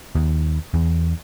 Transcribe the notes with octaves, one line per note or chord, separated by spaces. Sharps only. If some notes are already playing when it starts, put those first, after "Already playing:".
D#2
E2